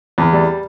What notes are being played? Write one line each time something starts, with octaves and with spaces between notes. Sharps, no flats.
E2
G3